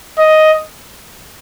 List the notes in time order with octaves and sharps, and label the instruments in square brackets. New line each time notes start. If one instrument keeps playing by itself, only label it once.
[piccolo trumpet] D#5